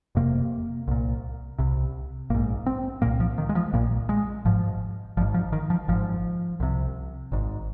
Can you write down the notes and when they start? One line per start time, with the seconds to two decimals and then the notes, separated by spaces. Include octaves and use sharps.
0.15 F1 F2 C3 A#3
0.88 C2 A#2
1.58 C2 C3
2.30 A#1 G#2 A#3
2.66 C4
3.02 C2 A#2 A#3
3.20 F3
3.38 D#3
3.49 G#3
3.55 F3
3.73 A#1 A#2 A#3
4.09 G#3
4.45 G#1 G#2 F3
5.17 G#1 F3
5.21 G#2
5.34 F3
5.53 D#3
5.70 F3
5.88 G#1 G#2 F3
6.60 C2 C3
7.32 G#1 G#2